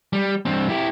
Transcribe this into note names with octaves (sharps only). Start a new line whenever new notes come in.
G3
G2 C4
E4 G4